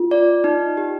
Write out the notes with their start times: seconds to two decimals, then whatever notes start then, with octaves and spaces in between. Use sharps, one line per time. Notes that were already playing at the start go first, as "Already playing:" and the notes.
Already playing: F4
0.11 D5
0.44 D#4
0.77 G4